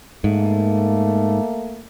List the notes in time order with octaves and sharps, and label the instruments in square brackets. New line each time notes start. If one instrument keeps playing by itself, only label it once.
[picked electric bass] G#2 [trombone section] A3 A#3